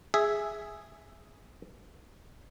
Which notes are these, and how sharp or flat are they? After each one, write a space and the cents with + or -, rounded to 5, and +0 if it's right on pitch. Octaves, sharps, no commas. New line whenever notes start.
G#4 +0 E5 +0